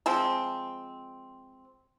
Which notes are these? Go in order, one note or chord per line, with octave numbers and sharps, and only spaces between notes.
F3 G#3 C4